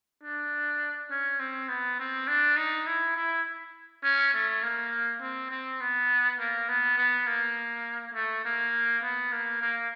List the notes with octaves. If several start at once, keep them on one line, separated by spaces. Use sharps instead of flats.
D4
C#4
C4
B3
C4
D4
D#4
E4
E4
C#4
A3
A#3
C4
C4
B3
A#3
B3
B3
A#3
A3
A#3
B3
A#3
A#3